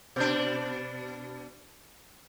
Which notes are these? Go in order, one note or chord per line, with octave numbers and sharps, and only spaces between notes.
B2 D4